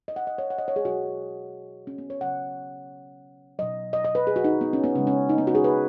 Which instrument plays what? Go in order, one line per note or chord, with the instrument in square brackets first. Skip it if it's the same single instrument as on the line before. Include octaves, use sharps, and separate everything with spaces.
[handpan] D#5
F#5
D#5
C#5
F#5
D#5
C#5
G#4
B2 F#3 F#4
C#4
B3
C#5
C#3 F#3 F#5
B2 F#3 D#5
D#5
D#5
B4
G#4
F#4
D#4
B3
C#4
B3
C#3 C#4
G#3
C#4
D#4
B3
F#4
G#4
B4